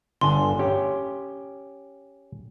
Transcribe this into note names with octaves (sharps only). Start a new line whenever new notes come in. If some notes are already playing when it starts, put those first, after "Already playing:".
G1 D3 G#5 A5 C6
C#4 G4